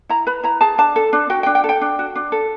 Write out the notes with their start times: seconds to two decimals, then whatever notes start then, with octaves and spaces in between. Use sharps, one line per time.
0.09 E4 A#5
0.27 B4 B5
0.43 E4 A#5
0.61 G#4 A5
0.78 D4 A5
0.96 A4
1.13 D4
1.30 F#4 G5
1.43 G5
1.46 D4
1.55 G5
1.64 A4
1.69 G5
1.81 D4
1.99 F#4
2.16 D4
2.32 A4